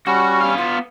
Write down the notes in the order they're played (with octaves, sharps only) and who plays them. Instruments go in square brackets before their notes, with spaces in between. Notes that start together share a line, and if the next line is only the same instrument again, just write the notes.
[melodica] G3 C#4 [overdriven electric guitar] F#4
[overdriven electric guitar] B3 F5
[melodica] F4